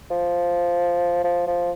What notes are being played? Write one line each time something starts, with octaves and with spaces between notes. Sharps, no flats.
F3
F3
F3